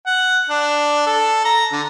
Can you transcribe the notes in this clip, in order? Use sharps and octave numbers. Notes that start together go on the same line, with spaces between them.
F#5
D4
A4
A#5
D3